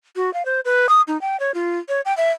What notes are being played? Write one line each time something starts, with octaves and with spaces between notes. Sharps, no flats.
F#4
F5
C5
B4
D#6
D#4
G5
C#5
F4
C#5
G5
E5